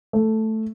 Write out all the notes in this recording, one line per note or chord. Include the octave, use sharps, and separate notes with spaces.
A3